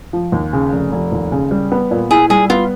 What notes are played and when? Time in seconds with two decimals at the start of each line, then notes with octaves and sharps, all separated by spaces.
0.13 F3
0.32 D#2
0.53 C#3
0.72 F1
0.92 F1
1.12 D#2
1.32 C#3
1.51 G3
1.72 B3
1.91 A#2
2.11 E4 G#4
2.30 G3 G#4
2.50 B3 F4